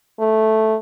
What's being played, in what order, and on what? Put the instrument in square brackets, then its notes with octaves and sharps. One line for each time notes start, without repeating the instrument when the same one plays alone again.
[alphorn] A3